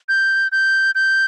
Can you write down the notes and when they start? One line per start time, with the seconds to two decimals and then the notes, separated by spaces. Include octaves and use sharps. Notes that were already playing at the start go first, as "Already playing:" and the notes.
0.09 G6
0.52 G6
0.95 G6